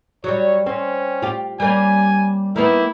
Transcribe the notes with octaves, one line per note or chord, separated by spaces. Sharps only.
F#3 G3 C#5
C4 C#4
F4 G4
G3 A#3 C#4 G#5
D#3 A#3 B3 E4